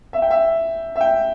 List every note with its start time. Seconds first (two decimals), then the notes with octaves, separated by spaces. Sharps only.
0.13 E5
0.22 G5
0.31 E5
0.96 E5
1.01 G5